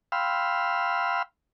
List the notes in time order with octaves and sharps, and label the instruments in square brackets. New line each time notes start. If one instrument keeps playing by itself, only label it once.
[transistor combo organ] F5 G5 B5 C6 E6 F6